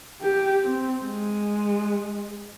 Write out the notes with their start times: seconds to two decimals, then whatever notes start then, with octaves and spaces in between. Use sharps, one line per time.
0.22 G4
0.63 C4
1.04 G#3